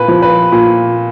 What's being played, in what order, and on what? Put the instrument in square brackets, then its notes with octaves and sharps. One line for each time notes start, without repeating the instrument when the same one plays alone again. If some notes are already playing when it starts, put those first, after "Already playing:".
Already playing: [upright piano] A#2 B4
F3
B4
A#2